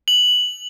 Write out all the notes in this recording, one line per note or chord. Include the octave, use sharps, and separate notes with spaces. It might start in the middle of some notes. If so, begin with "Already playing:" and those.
F#7